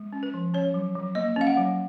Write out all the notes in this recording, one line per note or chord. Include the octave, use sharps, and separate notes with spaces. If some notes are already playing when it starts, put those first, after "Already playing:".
Already playing: G#3
C#4
B4
F3
C#4 C#5
F#3
F#3
A#3 D#5
C#4 F5
F#5
F#3